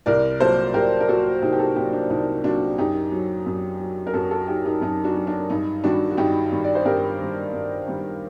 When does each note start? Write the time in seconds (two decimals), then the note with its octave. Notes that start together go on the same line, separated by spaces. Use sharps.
0.06 C2 A#4 D5
0.40 A#2 F#3 A4 C5
0.74 C2 G4 A#4
1.00 A#4
1.08 A#2 F#3 F#4 A4
1.42 C2 D#4 G4
1.53 G4
1.59 F#4 A4
1.76 A#2 F#3 D#4 G4
1.93 D4
2.10 C2 D#4
2.44 A#2 F#3 D4 F#4
2.78 F#2 D#4 G4
3.12 F#3
3.46 F#2
3.80 F#3
4.07 A#4
4.13 F#2 F#4 A4
4.31 F#4 A4
4.48 F#3 D#4 G4
4.65 D#4 G4
4.81 F#2 D#4
5.04 D4 F#4
5.16 F#3
5.27 D4
5.50 G2 D#4
5.84 D#3 G3 D4 F#4
6.11 F#4
6.17 G2 D#4 G4
6.52 D#3 G3
6.64 D5
6.75 C5
6.86 G2 G4 A#4
7.19 D#3 G3
7.53 G2
7.88 D#3 G3